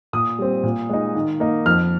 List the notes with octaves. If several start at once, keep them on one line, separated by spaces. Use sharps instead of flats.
A#2 D#6
G3 C4
A#2
G#3 D#4
D#3
A#3 D#4
F2 F6